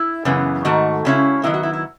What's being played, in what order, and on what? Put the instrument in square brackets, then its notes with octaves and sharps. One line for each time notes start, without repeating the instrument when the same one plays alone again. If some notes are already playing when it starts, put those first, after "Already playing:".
Already playing: [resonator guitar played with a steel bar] E4
F#2 C#3 E3 B3
G#2 D#3 A3 F#4
C#3 G#3 C#4 E4
D#3 F#3 B3 E4
F#4
E4
E4